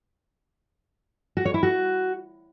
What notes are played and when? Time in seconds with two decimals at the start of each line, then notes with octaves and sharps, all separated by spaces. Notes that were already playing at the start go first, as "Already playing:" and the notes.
1.37 F#4
1.45 C#5
1.54 E4
1.63 F#4